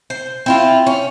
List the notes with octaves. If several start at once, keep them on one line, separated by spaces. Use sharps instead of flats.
C5
C4 E4 F4
C#4